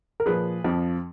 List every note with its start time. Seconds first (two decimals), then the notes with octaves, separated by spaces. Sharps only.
0.20 A#4
0.26 A#2 F3 G#4 B4
0.64 F2 F3